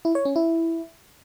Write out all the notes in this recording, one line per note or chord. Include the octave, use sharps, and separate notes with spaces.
E4
C#5
C#4
E4